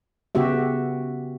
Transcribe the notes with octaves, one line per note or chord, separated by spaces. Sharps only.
C#3 B3 F#4 G4 E5